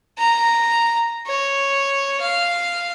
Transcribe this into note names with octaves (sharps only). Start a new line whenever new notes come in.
A#5
C#5
F5